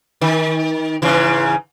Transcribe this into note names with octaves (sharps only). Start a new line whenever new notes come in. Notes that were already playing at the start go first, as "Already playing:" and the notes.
D#3
G#2 C#3 E3